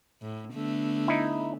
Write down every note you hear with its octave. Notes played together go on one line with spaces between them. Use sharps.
A2
D3 A3 B3
D#4 E4